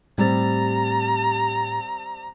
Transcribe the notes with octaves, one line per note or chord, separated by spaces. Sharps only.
A2 G3 C4 G4 A#5 A6